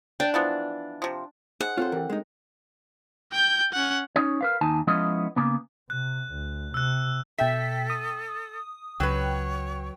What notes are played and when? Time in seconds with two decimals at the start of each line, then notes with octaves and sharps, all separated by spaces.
0.20 D4 G5
0.34 E3 F3 B3
1.02 C3 F3
1.61 D#4 G#4 C5 F#5
1.78 C4 F4 A4 C5 C#5
1.92 E3 G4 A4 A#4
2.10 G#3 D#4
3.32 G5 G6
3.72 C#4 F#5
4.16 C#4 D#4 C#5
4.41 A#4 B4 F5
4.61 D#2 D#4 G#5 A5
4.87 F3 G#3 B3 C#4 E4 D#5
5.36 C#3 A#3 B3
5.90 C3 F#6
6.32 D2
6.74 C3 E6 F#6
7.38 B2 A4 E5 G5 B6
7.90 D#6
9.00 C#2 F#3 B4 C#5 G5